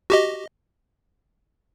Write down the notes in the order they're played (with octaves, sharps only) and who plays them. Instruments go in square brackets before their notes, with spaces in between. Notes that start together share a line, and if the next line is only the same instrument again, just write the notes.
[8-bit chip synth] F#4 G4 D#5